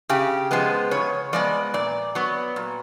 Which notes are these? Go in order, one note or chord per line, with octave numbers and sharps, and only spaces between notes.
C#3 G4
F3 G#3 B3
C#3 C#5
F3 G#3 B3 D5
A#2 D5
F#3 B3
A#2